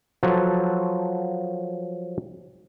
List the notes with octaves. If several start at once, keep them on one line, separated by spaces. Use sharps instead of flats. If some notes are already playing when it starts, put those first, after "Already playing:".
F3 F#3 A4 B4